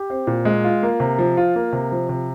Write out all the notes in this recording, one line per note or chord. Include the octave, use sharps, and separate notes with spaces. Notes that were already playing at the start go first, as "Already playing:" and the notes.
Already playing: G4
C4
A#2
G#3
F4
A#3
C3
F3
F4
A#3
C3
F3
C3